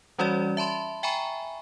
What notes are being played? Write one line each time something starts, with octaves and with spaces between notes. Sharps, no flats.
E3 G3 C#4 F#4 C#5 D5
E5 A5 B5 C6
E5 G5 G#5 A#5 B5 C#6